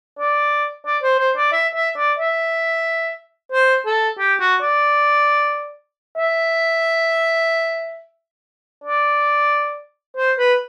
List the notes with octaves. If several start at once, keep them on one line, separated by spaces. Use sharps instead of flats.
D5
D5
C5
C5
D5
E5
E5
D5
E5
C5
A4
G4
F#4
D5
E5
D5
C5
B4